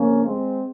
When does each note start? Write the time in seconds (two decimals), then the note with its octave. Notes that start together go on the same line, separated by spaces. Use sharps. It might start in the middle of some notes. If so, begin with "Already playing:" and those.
Already playing: F2 C#3 F3 A#3 C#4
0.25 G#3 C4